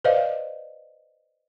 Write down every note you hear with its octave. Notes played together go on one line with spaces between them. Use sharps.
B4 C5 D5 D#5 F5